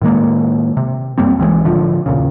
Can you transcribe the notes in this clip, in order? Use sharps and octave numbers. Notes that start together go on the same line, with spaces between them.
A2 D#3 G#3 A#3
C3
F#2 G3 A#3 C4
C2 E3 F#3 G#3
A2 D3 F3
D#2 A#2 C#3